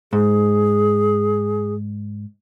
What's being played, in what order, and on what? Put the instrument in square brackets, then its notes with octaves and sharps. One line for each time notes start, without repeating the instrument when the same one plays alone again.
[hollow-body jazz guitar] G#2 [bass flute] G#4